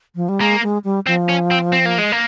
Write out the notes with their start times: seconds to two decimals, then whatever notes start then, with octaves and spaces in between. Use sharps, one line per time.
0.15 F3
0.29 G3
0.41 G#3 A#3
0.63 G#3
0.84 G3
1.07 F3 C4
1.29 C#4
1.51 C4
1.73 C4
1.86 A#3
1.98 G#3
2.12 A#3